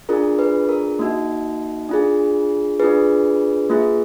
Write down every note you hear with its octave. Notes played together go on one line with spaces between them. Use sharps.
D4 F4 G#4 A#4
B4
A#4
A#3 D#4 F#4
D4 F4 G#4
D4 F4 G#4 B4
A#3 F4 G#4